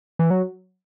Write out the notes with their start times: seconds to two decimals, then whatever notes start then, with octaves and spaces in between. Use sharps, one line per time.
0.19 E3
0.30 F#3